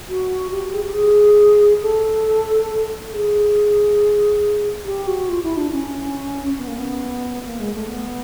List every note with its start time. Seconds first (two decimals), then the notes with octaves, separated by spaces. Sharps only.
0.09 F#4
0.51 G4
0.73 G#4
0.83 G4
0.93 G#4
1.82 A4
3.12 G#4
4.84 G4
5.07 F#4
5.28 F4
5.43 E4
5.57 D4
5.72 C#4
6.58 B3
6.67 A#3
6.77 B3
7.45 A#3
7.60 G#3
7.74 A3
7.88 B3